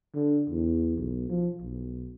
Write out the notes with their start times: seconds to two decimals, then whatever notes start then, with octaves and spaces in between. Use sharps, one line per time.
0.14 D3
0.50 E2
0.97 B1
1.29 F3
1.61 B1